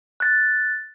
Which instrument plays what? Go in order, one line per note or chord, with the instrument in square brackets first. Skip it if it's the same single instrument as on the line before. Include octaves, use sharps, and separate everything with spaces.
[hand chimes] F#6 A6